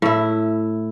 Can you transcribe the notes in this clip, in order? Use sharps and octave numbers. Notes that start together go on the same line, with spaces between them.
A2 E4